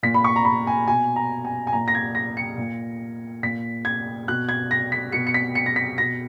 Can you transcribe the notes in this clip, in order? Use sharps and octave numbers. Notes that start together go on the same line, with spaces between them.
A#2 B6
B5
C#6
A#5
B5
G#5
B2 G#5
A#5
G#5
G#5
A#2 A#5
A#6
G#6
A#6
C#7
A#2
A#2 B6
G#6
B2 F#6
G#6
A#6
B6
B2 C#7
C#7
B6
C#7
A#6
B6
B2 A#6